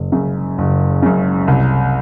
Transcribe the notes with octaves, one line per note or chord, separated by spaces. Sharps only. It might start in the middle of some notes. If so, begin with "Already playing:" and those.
Already playing: F#1
F#2 C#3
F#1
F#2 C#3
C2